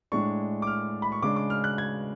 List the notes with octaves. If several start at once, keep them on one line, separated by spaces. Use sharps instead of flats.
A2 G#3 D4 C#6
D6
F6
B5
C#6
C#3 G#3 D4 D6
D6
F6
F#6
G#6